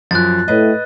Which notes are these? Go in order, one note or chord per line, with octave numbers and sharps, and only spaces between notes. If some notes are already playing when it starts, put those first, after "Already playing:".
F#2 F3 F#6 A6
A2 B4 D#5